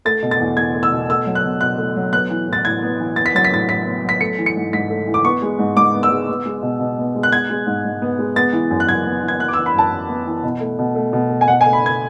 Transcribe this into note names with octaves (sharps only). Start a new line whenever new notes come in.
A3 A6
B2
A6
E2
E2 G#6
A3
E6
B2
A3 E6
F#3
F#6
B2
B2 F#6
A3
F#3
B3 F#6
E3
A2
A6
A2 G#6
B3
E3
B3 A6
B6
F#3 A6
B6
A2 A6
A2 B6
B3
F#3 B6
A3 C#7
E3
C#7
G#2
G#2 B6
A3
E3
D6
B3 C#6
G#3
G#2
G#2 D6
B3
E6
G#3
B3
G#3
B2
B2
B3
G#3
F#6
B3 G#6
G#3
G#2
G#2
B3
G#3
B3 A6
E3
F#2
F#6
F#2 G#6
B3
E3
G#6
B3 F#6
D6
E6
E3
B5
F#2 A5
F#2
B3
E3
B2
A3
B2
A3
B2
A3
G#5
B2 F#5
G#5
A3
B5
B2 G#6